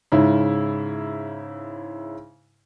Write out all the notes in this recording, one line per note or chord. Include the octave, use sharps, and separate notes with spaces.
G#2 C#3 E4